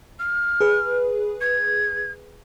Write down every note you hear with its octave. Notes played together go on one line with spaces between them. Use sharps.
F6
G#4 B4
G#6